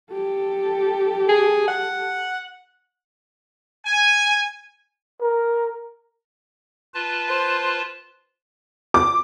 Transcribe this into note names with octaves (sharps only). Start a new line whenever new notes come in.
G4 A4
G#4
F#5
G#5
A#4
F4 B4 A5
C5
D6